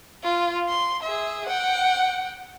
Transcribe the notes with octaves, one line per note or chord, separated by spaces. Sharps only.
F4
C6
G#4 E5
F#5 G5